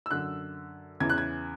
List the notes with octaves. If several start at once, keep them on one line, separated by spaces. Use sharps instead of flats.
E6
F#2 D3 F#6
E2 C#3 E3 G#6
F#6
G#6